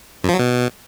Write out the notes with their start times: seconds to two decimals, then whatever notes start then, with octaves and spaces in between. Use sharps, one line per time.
0.24 F#2
0.29 F3
0.34 F#3
0.39 B2